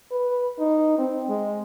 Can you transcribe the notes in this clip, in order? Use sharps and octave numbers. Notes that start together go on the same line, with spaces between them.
B4
D#4
C4
G#3